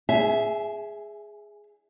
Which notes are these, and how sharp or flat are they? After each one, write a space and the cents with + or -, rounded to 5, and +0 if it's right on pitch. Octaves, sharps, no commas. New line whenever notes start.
G#4 +0 E5 +0 G#5 +45